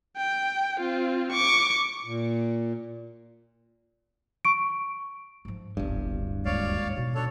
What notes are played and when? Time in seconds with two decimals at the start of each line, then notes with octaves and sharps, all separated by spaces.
0.17 G5
0.80 C4 F4
1.32 C#6 D6
2.04 A#2
4.45 C#6 D7
5.45 G#2 F3
5.77 D1 G1 G2
6.45 G#1 D#2 C#5 D5 F5
6.97 B2 D#4
7.15 D4 A4 C#5